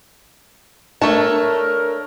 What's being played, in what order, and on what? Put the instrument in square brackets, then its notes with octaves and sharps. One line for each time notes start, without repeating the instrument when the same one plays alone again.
[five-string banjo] A3 A5 [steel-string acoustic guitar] D4 C#5 [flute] A#4